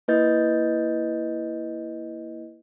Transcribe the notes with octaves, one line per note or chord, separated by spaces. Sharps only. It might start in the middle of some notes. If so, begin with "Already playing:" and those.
A#3 E4 B4 D#5 G6 A6